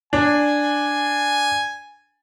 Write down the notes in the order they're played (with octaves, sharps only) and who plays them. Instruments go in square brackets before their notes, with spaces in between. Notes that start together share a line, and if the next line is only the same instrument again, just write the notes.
[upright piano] D4 [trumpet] G#5